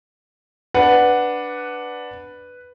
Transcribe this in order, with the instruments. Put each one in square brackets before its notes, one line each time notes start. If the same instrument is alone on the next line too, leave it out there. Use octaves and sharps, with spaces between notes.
[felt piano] D4 F#5 [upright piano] B4